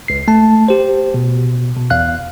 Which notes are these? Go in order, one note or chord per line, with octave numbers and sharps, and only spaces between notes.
C#2 C7
A3 A5
G4 C5
B2
B2
E2 F5 F#6